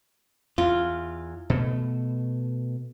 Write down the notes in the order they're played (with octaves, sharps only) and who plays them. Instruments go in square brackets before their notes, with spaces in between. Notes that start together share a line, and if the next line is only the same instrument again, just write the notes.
[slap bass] E2 [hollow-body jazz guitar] F4
[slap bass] B2 A3